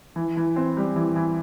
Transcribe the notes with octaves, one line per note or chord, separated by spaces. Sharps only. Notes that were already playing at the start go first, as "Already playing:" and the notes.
E3
E3
C4
G3
E3
E3